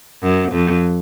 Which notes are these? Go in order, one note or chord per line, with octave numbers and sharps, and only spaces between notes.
F#2
F2